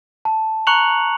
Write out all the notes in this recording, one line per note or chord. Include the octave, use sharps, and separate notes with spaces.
A5
A#5 C#6 F#6 C#7 F7 F#7